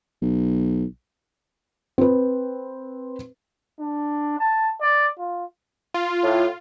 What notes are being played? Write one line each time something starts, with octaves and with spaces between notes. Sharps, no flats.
B1
C4 B4
D4
A5
D5
F4
F4
A2